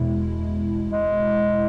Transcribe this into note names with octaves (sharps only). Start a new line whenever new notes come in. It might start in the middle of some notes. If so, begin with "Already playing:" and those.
Already playing: E2 B2 G#3 E4
G#3